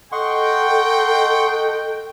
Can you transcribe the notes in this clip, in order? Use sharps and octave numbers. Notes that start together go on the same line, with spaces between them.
A4 D#5 F#5 G5 C6 C#6